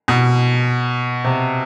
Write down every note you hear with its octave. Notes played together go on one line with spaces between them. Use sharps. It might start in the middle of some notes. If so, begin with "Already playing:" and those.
B2
C3